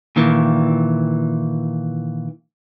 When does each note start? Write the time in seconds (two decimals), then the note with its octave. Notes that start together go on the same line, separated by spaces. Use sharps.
0.16 A#2 D#3 E3